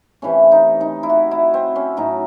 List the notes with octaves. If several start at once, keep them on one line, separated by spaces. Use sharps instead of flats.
C3 E3 A3 C#4
D#4
D#4
E4
F#4
E4
C4
C#4
A2 F#3 A3 D#4